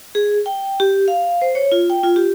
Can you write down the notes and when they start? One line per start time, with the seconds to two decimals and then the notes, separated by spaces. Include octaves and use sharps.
0.15 G#4
0.46 G5
0.80 G4
1.08 F5
1.42 C5
1.55 C#5
1.72 F4
1.90 G5
2.03 F4
2.16 G4